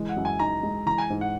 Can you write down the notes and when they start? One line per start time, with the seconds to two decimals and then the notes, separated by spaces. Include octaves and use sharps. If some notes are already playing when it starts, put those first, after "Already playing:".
Already playing: E3 G#3
0.09 F#5
0.16 F#2
0.25 G#5
0.39 D#4 A#5
0.63 G#3
0.86 E3 A#5
0.98 G#5
1.10 G#2
1.21 F#5